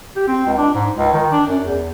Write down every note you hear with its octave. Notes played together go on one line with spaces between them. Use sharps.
G4
C4
C#2
D4
G#2
C#2
D#3
D4
F#2
E2